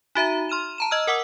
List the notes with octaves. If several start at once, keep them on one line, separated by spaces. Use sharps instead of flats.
D#4 F#4 E5 A#5
C6 F6 D#7 E7
A5 A#5 E7
D#5 E6 F6
A#4 F#5 D6 E6